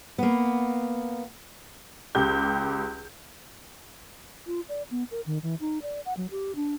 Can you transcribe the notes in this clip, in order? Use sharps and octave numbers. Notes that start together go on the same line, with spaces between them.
A#3 B3
C#2 G4 G6
F4
D5
B3
A#4
D#3
E3
D#4
D5
F#5
F#3
G4
D4